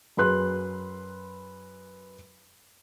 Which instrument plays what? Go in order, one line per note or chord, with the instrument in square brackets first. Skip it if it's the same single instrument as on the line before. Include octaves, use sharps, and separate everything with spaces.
[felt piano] F#2 G#4 B4 C6 F#6